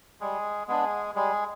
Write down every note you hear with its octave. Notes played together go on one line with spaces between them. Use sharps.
G3 G#3 G#4
G#3 B3 D4 G#4
G3 G#3 G#4